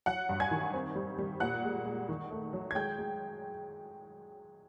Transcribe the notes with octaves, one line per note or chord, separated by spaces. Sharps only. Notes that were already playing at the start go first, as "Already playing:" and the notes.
F#3 F#5 F#6
G2
G#5 G#6
D#3
C4
G3
G3
A#2 F#5 F#6
G#3
G#3
D#3
A3
F#3
G#6
G#3 G5 G6
G#3